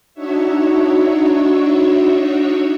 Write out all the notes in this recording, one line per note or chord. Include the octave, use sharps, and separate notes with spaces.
D4 D#4 F#4 C#5 E5